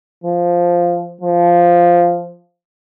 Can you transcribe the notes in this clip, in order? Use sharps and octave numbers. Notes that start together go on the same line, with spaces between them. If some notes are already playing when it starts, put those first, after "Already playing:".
F3
F3